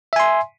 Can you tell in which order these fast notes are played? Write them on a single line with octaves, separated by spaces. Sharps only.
E5 G#5 C6